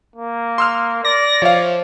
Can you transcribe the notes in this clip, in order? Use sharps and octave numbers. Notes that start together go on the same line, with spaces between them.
A#3
C6 E6 F6
D5 A#6
F3 C#5 E5 F5